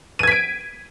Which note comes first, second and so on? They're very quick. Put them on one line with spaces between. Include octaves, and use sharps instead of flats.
D#7 G#6 B6 D7